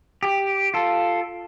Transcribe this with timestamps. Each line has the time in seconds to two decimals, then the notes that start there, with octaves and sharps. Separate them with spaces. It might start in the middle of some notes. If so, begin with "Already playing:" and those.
0.23 G4
0.74 F4 A4